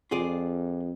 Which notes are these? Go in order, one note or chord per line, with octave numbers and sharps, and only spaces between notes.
F2 F4 G#4 D5